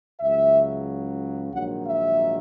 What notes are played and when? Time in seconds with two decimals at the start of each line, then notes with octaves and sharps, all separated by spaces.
0.20 C#2 C#3 F#3 E5
1.53 A#1 G#2 D#3 F#3 F#5
1.86 E5